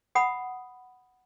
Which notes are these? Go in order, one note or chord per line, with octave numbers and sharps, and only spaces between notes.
F#5 B5 D#6